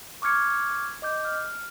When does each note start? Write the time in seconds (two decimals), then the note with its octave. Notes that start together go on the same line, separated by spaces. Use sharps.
0.22 C#6 D6 F6 G#6 C#7
1.02 D#5 D6 G6
1.25 F6